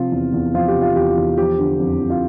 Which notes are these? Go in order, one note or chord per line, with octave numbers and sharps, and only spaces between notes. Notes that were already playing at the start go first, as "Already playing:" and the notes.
Already playing: C3 F3 F4
E2
E2
F3 F4
G4
C3
F4
E2 G4
F4
E2
F3 G4
D3
F2
F2
F4